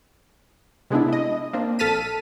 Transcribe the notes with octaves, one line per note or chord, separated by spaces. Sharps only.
C3 G#3 B3 D4 E4
E4 D#5
A#3 C4 D4
A#1 A4 A5 F6 B6 D#7